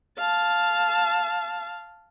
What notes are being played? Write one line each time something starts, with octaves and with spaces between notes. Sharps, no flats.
F5 A5